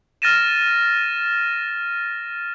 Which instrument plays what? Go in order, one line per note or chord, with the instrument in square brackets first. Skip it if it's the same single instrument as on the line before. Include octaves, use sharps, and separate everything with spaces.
[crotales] F6 A6 A#6 D#7 E7